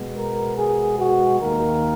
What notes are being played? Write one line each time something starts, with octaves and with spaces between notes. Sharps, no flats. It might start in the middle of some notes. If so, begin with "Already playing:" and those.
Already playing: B2 G#3 B3
A#4
G#4
F#4
D#2 D#3 A#3 A#4